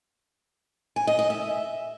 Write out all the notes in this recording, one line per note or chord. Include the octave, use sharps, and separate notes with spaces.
G#5
D#5
D#5
E5